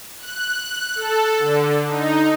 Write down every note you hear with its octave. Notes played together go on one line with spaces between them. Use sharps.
F#6
A4
D3
D#4